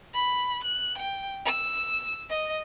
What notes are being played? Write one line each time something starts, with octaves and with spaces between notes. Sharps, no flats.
B5
F#6
G5
E6
D#5